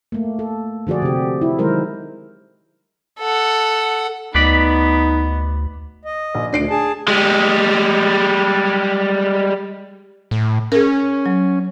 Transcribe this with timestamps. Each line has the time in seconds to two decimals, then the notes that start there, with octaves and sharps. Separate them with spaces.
0.12 A3 A#3
0.39 A4
0.87 D3 F3 F#4 G#4 D5
1.02 C3 G4
1.41 E4
1.59 D#3 F#3 G#3 E4 A#4 C5
3.19 A4 F#5
4.35 D2 B3 D#4 B4 D5 B5
6.05 D#5
6.35 A#1
6.53 D2 D4 C7 D7
6.70 G#4 A5
7.08 G3 G#3
10.31 A2
10.72 C#4 G#4 A#4
11.26 F#3